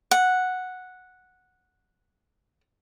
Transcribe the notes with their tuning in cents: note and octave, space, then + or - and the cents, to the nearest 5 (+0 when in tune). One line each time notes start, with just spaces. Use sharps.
F#5 -5